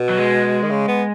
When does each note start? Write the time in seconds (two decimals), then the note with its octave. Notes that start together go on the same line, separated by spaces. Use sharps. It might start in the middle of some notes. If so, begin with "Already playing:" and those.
Already playing: B2
0.09 F#3
0.18 G#3
0.63 D#3
0.70 C#3
0.88 B3